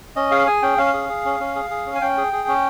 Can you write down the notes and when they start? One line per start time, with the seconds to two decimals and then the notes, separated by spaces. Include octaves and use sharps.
0.16 C#4 D#5
0.31 G#4 F5
0.47 G#4 G#5
0.62 C#4 G5
0.78 C#4 F5
0.94 G#4
1.09 G#4
1.25 C#4
1.40 C#4
1.56 G#4
1.70 G#4
1.86 C#4
1.95 G#5
2.01 C#4 G5
2.17 G#4
2.33 G#4
2.48 C#4